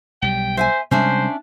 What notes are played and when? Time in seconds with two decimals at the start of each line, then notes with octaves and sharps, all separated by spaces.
0.22 B1 G3 G5
0.57 C5 E5 F#5 G#5
0.91 C3 G3 G#3 C#4 D4 C5 E5